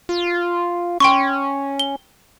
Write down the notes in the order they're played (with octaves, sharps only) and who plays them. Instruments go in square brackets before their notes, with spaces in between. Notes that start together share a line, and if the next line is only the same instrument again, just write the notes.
[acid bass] F4
[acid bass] C#4 [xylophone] G5 C6 C#6
[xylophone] G7